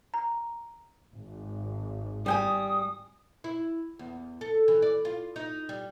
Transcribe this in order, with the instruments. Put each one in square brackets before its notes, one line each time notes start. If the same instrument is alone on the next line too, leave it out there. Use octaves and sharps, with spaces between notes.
[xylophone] A#5
[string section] G#1
[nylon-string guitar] G3 G5 G#5 [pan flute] D#6
[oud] E4
E2
A4
E3
D5
F4
D#4
G3